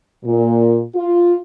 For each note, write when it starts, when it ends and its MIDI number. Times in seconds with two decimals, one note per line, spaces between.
0.24 0.82 46
0.95 1.36 65